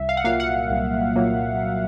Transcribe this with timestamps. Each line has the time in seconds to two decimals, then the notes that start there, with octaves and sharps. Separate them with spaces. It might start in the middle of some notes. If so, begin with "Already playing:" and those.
Already playing: C2 E5
0.09 F5
0.17 F#5
0.24 A#2 F#3 A#3 F5
0.40 F#5
0.70 C2
1.16 A#2 F#3 A#3